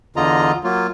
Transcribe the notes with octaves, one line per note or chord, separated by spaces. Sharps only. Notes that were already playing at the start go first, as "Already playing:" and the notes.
E2 D3 F4 D#5 A#5
F#3 A#3 F4